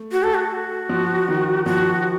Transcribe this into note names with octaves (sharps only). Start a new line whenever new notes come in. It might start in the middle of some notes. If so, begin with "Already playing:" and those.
Already playing: A3
F#4
A4
F#4
F3
D#3
F3 F#4